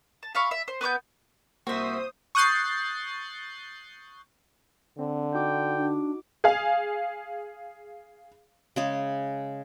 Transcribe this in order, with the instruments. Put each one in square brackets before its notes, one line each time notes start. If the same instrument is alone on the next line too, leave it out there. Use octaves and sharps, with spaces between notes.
[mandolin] A5
E5 F5 B5 C#6
E5
C5
B3 B4 D6 G6
[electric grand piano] C2 A#3 [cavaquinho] F#4 E5 [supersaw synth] C5 D#6
[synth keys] C#6 D#6 F#6 G6 A6 C7
[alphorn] D3 [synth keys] C4
[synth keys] D#4 F#4 D6 [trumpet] G5
[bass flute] D4
[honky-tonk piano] G#4 F5
[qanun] C#3 G#3 G#4